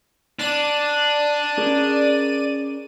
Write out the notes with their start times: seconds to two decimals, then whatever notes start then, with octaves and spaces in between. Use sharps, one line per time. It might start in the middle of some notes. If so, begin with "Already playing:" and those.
0.39 D4 D5 D#7
1.57 C#4 G#4 A#4